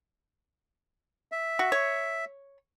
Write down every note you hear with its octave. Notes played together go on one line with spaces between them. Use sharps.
E5
F#4
C#5